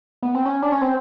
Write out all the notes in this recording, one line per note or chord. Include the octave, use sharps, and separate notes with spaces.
B3
C4
C#4
D4
C#4
C4